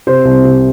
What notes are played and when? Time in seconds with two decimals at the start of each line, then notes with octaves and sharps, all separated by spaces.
0.07 C3 C5
0.25 C2
0.44 C3